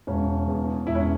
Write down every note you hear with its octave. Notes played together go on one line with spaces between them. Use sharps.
E1 C#4
E2
E1 E4
C#4